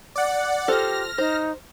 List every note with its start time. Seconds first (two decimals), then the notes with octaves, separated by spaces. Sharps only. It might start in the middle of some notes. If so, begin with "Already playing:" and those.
0.16 D5 F#5
0.68 F4 G4 A4 C5 F6 A#6
1.18 D#4 C5